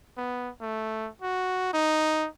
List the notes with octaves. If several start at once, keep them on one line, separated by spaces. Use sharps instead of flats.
B3
A3
F#4
D#4